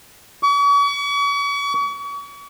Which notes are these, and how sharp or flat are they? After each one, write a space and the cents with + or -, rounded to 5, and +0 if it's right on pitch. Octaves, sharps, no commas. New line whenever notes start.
C#6 +40